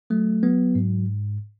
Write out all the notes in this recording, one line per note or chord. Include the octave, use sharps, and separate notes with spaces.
F#3 A3
F#3 B3
G#2